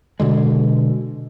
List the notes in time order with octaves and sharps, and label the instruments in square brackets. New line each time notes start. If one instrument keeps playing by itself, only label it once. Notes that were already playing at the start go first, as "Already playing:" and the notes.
[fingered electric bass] B2 D3 G#3